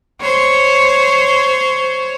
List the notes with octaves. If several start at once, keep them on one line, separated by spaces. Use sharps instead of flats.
C5 C#5